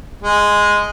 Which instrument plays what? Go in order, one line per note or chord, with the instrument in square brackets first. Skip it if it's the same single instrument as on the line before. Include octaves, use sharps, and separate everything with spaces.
[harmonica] G#3